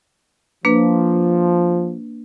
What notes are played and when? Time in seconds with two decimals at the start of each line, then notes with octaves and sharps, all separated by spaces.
0.65 F3 A#3 D4 B4